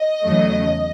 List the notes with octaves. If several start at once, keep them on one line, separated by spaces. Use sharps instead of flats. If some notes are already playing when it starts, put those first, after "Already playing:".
Already playing: D#5
E2 C#3 F#3 A3